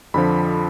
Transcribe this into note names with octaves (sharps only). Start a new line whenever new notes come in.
F2 D3 F3 B5